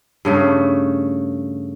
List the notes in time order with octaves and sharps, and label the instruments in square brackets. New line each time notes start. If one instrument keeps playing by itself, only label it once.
[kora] G2 C#3 A3